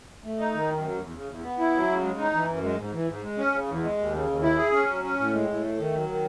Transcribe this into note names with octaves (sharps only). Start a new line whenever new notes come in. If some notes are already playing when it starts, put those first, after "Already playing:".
A3
D#4
D#3
F#2
F#3
E2
C#3
E2
B3
E4
F#3
C#3
G#3
D#4
E3
F#2
G#3
G#2
E3
G#2
G#3
C#4
C#3
E2
G#3
D#2
C#3
D#2
E4
G#4
C#4
F#3
C#4
A2
G#3
A2
A3
D#3
F#3
D#3